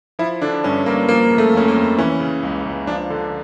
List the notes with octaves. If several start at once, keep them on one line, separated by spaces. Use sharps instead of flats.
F3 E4
D3 D4
G2 C#4
G2 A#3
F3 A#3
C#3
A3
F2 C#4
A#3
F2
E3 C#4
C#3
C#2
C#2
F3 D4
D3